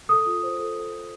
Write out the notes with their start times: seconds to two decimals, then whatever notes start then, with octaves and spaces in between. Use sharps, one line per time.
0.09 A4 D#6
0.26 F4
0.43 C5
0.59 A4
0.76 A4
0.93 A4